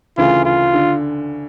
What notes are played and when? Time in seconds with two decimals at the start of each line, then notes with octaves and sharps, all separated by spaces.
0.18 D2 C#3 E3 F4
0.45 F4
0.74 D3